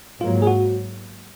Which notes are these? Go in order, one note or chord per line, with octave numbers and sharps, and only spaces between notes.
G#2 F#3 A#3 F4
G#4
F#4